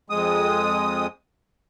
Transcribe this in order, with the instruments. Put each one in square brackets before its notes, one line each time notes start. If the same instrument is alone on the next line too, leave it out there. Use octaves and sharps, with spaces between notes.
[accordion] F2 G#3 D#6